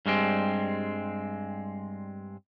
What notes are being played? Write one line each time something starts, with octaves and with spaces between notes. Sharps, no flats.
G2 G3 G#3 C4